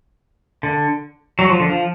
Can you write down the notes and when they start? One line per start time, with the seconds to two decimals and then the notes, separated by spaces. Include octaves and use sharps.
0.63 D3
1.39 F#3
1.50 F3
1.60 D3
1.70 F3